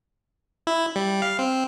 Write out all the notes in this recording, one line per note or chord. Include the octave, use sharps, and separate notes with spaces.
E4
G3
F5
C4